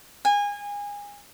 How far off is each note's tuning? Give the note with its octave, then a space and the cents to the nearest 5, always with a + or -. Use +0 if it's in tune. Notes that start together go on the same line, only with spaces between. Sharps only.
G#5 -25